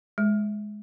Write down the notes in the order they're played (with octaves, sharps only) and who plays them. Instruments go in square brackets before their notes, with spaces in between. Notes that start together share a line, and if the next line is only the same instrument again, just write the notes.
[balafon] G#3